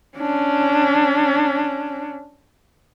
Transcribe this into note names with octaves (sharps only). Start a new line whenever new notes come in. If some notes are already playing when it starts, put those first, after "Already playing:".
C#4 D4